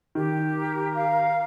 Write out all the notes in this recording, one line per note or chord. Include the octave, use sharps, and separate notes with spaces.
D#3 G4
A#4
F5